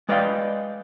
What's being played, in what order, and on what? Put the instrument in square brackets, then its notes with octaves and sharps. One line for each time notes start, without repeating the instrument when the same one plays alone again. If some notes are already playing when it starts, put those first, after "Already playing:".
[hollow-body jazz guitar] G#3 B4 D5 D#5 F5 G5